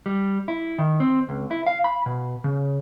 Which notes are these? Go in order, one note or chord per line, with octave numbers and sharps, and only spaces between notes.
G3
E4
D#3
C4
C#2
E4
F5
B5
B2
C#3